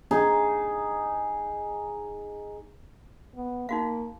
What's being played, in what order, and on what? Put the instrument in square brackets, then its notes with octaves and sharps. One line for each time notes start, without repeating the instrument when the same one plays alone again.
[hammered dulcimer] D#4 G#4
[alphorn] B3
[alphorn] A#3 [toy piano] D#4 F#4 F5